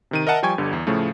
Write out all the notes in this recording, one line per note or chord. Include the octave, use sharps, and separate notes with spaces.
C3 D#3 D#7
A#4 D#5 E5 F#5 A5
F3 G3 G5 G#5 C#6 G#6
G1 D3 G3
E2
A2 C#3 F3 A3